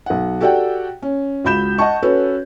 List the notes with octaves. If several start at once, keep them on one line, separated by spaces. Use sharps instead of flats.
B1 F#5
F#4 G4 A4 D5 F#5 G5
C#4
C#2 F#4 B5 G6 E7
D#5 F#5 A5 C#6
C#4 F#4 A4 B4 C#5